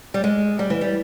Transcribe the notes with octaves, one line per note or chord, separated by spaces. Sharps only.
G3
G#3
G3
E3
G3